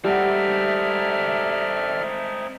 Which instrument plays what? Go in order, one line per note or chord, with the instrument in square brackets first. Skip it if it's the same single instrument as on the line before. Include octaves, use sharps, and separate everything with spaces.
[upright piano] G3 F#5 [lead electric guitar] C4 D#4 [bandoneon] A4 D5 F6 [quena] E5